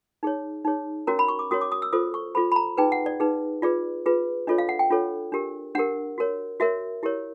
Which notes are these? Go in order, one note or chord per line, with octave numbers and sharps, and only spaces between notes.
D#4 G#4 C#5
D#4 G#4 C#5
C#4 F#4 A#4 C#5 A#5
B5
C#6
D6
C#4 F#4 A#4 C#5 D#6
D6
D#6
E6
F4 A4 C5 D#6
C#6
F4 A4 C5 B5
B5
A#5
D#4 G#4 B4 G5
F#5
D5
D#4 G#4 B4
F4 G#4 B4 D5
F4 G#4 B4
D4 F4 A4 C#5 D#5
F5
F#5
G5
D4 F4 A4 C#5
D4 G4 A#4
D4 G4 A#4 F#5
F#4 A#4 C#5
F#4 A#4 C#5 E5
E4 G4 A#4 C#5